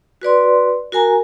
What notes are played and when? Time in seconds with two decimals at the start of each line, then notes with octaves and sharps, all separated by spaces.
0.22 F#4 B4 D5 C6
0.92 F#4 A#4 G#5 A#5